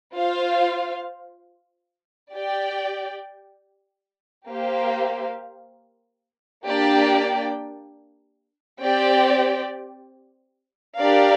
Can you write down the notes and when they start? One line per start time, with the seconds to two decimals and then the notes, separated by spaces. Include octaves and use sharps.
0.17 F4 C5 F5
2.33 G4 D5 G5
4.50 A#3 G4 C5 F5
6.67 A#3 D4 G4 D5 G5
8.83 C4 G4 D5 G5
10.99 D4 G4 A#4 D5 F5